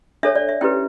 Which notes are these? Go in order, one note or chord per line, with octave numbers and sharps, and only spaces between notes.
D4 A4 C#5 E5
D5
E5
C#4 E4 G4 B4 G5